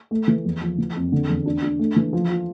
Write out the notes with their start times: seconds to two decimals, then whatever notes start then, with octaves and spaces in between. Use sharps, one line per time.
0.11 A3
0.28 E3
0.45 E2
0.61 F3
0.78 E3
0.95 F2
1.12 D3
1.29 E2
1.46 D4
1.62 D4
1.79 A3
1.96 E3
2.13 F3
2.30 F4